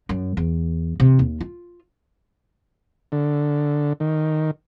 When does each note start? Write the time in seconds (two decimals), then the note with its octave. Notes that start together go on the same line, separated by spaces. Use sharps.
0.09 F#2
0.37 E2
1.00 C3
1.19 D#2
1.41 F4
3.12 D3
4.00 D#3